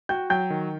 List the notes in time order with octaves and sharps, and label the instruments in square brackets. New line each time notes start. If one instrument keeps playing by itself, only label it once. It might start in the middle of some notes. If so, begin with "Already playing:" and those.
[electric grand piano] F#4 [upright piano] G5 G6
[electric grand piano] F#3 [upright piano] G5 G6
[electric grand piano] D#3